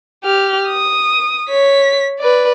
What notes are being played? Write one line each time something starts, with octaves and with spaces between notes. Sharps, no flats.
G4 F6
D#6
C#5 B6
B4 D5